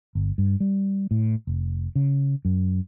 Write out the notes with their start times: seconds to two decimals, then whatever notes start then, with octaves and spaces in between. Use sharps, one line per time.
0.15 G1
0.38 G2
0.60 G3
1.11 A2
1.47 F1
1.95 C#3
2.45 F#2